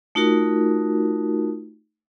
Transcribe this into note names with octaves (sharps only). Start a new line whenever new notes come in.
A3 D#4 F4 F#4 A#4